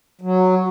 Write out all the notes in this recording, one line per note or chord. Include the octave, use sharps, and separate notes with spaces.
F#3